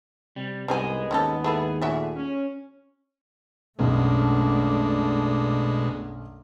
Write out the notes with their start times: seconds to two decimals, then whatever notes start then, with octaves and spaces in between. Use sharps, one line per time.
0.36 C3 G3
0.68 C2 G#2 G3 B3 D#4 G#4 D#5 G#5
1.11 D#2 C#4 G4 A4
1.44 E4 G#4 A4 B4
1.82 A#2 A3 F#4 E5 G#5
2.16 C#4
3.79 B1 F#2 B2 G#3 A3 D4